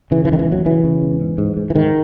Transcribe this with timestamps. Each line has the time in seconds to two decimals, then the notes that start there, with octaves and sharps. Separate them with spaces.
0.11 C#3 E3
0.25 E3
0.29 E1 D#3
0.39 E3
0.48 D#2 F#3
0.65 C#3 E3
0.84 C#3
1.02 E1
1.21 G#2
1.38 G#2
1.57 G#2
1.70 E3
1.75 G#2 D#3